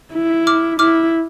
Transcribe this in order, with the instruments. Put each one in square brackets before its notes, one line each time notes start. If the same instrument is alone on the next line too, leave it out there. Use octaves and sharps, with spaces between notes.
[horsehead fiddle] E4
[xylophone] D6 F6
[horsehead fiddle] E4 [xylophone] D6 F6